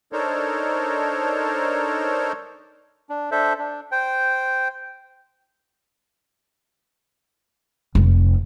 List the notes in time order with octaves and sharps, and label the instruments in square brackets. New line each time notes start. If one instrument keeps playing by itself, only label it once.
[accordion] D4 D#4 A4 A#4 C5 C#5
[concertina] D4
D4 A4 C5 E5
D4
C5 G5
[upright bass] F1